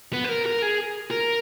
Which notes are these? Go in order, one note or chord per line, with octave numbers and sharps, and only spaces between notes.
B3
B4
A#4
A#4
G#4
A#4